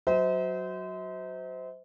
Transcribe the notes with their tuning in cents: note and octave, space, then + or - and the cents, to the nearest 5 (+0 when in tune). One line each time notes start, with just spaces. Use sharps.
F#3 +0 C5 -30 E5 -45